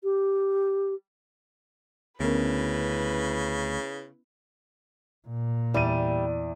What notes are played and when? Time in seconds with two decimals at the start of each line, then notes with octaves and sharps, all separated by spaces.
0.04 G4
2.20 D2 C#3 B3 C#4 E4 A#4 B4
5.28 A#2
5.74 E2 G3 D5 D#7